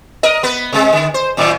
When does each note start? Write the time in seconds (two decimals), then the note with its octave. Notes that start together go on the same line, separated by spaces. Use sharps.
0.23 A#4 D#5
0.43 B3 B4
0.72 C3 G#3
0.93 D3
1.14 C5
1.37 F#2 A2 D#3